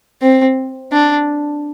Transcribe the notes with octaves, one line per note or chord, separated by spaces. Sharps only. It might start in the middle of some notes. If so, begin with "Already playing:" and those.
C4
D4